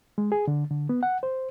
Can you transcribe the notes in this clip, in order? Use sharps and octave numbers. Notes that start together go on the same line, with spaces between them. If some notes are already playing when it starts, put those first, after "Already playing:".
G#3
G#4
D3
D3
B3
F#5
C5